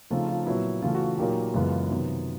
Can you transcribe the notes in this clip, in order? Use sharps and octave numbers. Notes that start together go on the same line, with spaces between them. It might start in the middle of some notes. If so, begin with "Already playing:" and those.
C#3 F3 A3 C4 D#4 F4
F4
A#2 F#3 B3 E4
C#3 E3 A3 F4
F#4
F4
A#2 F#3 A#3 D#4 G4
F#2 C#3 E3 G#3 B3 F4
C3 D#3 F#3 B3